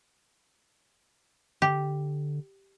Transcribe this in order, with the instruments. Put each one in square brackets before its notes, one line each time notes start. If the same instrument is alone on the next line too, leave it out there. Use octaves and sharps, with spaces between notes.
[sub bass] D3 [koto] G4